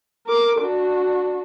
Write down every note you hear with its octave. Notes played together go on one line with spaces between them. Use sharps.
A#4 D6
D4 F#4